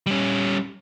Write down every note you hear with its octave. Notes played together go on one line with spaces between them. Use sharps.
G3 C#4